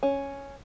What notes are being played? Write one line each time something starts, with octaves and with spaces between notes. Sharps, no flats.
C#4